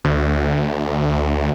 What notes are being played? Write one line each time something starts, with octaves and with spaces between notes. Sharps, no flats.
D2